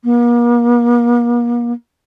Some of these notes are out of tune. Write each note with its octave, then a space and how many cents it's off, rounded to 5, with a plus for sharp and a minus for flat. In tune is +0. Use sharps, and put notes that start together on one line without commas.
A#3 +40